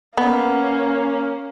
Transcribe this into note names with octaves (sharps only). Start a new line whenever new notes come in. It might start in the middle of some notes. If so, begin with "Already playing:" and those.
A#3 B3 C#4